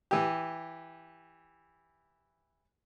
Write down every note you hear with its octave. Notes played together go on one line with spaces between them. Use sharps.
E3 G4